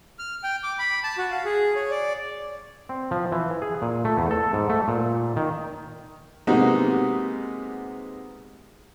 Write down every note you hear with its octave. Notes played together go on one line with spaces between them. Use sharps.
F6
G5
D6
B5
A5
F#4
F5
G#4
C#5
D5
C4
F3
E3
G#4
A#2
A3
E2
A4
G#2
A3
A#2
D#3
C3 G#3 A#3 B3 D#4 F#4